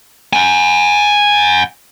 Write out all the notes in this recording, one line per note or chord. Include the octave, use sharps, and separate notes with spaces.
F#5 G#5